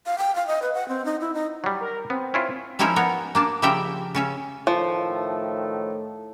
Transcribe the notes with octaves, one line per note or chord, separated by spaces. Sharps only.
F5
G5
F5
D#5
B4
F#5
C4
D#4
E4
D#4
F#3 G3
A#4
B3 C4
C#4 E4 F4
F3 C#4 D#4 E4 A#4 E5
B3 A#4 C#5
A#3 D4 A5
C#3 F3 G3 A#4 E5 G5
C#3 C#4 E5
A2 D#3 F3 A3